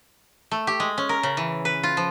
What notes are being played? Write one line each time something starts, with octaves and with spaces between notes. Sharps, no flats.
A3
G4
G#3
C#4
A#4
C#3
E3
B4
F4
F3